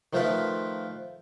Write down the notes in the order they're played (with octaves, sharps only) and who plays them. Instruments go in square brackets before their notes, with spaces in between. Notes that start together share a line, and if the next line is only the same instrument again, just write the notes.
[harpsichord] D#3 F3 A3 F4 A#4 B4